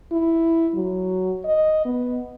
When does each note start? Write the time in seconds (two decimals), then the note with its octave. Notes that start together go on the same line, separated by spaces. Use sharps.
0.12 E4
0.75 F#3
1.44 D#5
1.85 B3